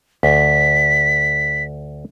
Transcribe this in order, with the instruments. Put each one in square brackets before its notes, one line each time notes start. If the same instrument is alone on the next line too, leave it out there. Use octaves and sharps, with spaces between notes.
[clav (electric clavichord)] D2 [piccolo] B6